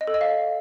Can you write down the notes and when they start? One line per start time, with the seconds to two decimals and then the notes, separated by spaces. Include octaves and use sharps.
0.01 D#5
0.07 A4
0.14 D#5
0.21 F5